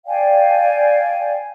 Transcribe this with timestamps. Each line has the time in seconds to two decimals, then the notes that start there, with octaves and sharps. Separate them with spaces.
0.07 D5 F5 G5 G#5